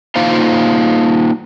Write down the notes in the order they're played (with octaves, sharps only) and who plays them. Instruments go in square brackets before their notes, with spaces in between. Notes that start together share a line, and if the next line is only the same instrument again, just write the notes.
[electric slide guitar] A#3 D#4 F4 C5 F5